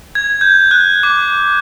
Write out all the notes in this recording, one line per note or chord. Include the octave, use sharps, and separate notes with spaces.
G#6
G6
F#6
D6